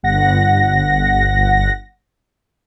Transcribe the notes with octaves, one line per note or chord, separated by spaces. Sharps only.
G1 F#5 A#6